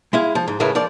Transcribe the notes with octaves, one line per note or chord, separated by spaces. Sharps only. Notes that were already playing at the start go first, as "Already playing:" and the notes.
G#3 E4 F5
F3
G#2
A2 C#3 G#3 E4 A#4 B4
F3 A#4 D5